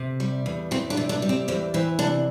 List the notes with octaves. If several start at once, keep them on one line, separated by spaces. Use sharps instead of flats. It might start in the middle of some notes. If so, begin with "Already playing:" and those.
Already playing: C3
G3
E2
E3 C4
D4
C3
D4
G3
C4
E2 C4
E3 C4
C3 D4